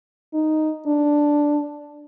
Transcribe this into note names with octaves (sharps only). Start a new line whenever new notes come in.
D#4
D4